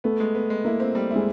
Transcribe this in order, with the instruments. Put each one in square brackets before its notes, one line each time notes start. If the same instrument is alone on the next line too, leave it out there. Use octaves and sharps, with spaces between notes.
[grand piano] A3 [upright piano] B3
[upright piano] G#3
B3
G#3
[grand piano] A#3 [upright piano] E4
[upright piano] C4
G3
[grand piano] G#3 [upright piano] E4